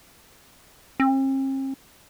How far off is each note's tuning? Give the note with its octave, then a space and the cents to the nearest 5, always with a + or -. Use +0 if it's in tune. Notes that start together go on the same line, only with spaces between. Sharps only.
C4 +45